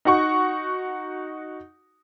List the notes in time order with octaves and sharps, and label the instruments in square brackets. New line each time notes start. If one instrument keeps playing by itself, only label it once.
[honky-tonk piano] D#4 F#4 F#5 C#6